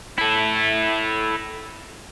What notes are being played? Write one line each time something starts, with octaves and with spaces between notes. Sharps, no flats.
E4 A4